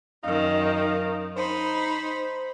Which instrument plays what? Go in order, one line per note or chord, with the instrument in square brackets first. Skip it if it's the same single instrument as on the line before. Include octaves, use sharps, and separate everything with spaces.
[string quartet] F#2 D#3 [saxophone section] D#4 F5
[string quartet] D#4 B5 [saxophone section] C5